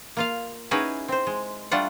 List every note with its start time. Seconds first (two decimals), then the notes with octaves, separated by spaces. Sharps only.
0.17 A#3 F4 F5
0.71 C#4 D#4 E4 F#4 G#4 B4
1.08 C4 C5
1.27 G#3
1.71 G3 A3 D4 F4 F#5